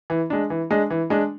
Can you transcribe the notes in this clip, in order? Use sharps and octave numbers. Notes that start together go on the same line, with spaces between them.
E3
G#3 D4
E3
G#3 D4
E3
G#3 D4